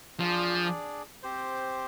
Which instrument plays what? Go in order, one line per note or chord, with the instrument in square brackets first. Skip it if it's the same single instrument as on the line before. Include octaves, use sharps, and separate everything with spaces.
[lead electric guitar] F3 [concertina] D4 G#4 D5
[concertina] C4 G4 C5